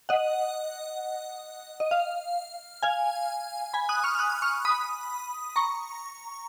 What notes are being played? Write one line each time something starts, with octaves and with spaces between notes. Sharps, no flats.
D#5 F#5
D#5
F5
F5 G#5
G#5 B5
D#6 F#6
C#6 F6
F6
D#6 F#6
C#6 F6
B5 D#6
A#5 C#6